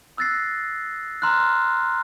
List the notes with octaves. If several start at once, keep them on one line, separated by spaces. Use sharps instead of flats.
D#6 E6 F#6 A6 A#6 C7
A#5 C6 F6 F#6